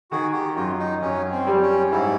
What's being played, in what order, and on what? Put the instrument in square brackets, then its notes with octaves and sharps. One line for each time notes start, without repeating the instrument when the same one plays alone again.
[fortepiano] D#3 [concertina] F#4 G#4
[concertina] G4
[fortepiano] F#2 [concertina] F4
[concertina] D#4
[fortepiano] F#2 [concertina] C#4
[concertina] C4
[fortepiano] G3
[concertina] C#4
[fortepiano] G#2 [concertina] E4